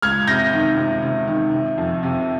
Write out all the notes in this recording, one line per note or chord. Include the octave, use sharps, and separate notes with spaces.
C#2 F6 G#6
C3 G6 A#6
D#3
C3
C3
D#3
C3
F2
C3